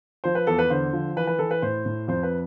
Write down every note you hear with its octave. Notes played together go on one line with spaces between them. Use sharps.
F3 C5
B4
E2 A4
B4
D3 C5
F3
E3 B4
B4
E3 A4
B4
A2 C5
A2
F2 C5
B4